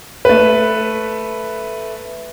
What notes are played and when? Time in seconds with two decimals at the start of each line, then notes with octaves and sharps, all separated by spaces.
0.25 A3 B4